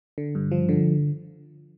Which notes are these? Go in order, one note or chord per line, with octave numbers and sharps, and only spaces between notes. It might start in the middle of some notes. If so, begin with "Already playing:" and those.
D3
G2
F3
D3